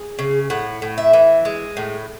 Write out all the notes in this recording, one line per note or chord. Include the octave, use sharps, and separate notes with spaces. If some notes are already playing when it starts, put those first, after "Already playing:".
Already playing: G#4
C#3
A2 F#5
A2
E5
E3
G#3
A2